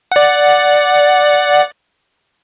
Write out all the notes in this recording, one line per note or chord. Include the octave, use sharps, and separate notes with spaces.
D5 F#5